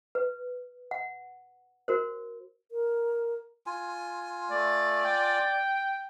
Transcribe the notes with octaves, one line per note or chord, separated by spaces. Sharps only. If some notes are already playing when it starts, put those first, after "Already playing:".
B4
F#5
F#4 A#4 C5
A#4
F4 G#5
A3 D5
G5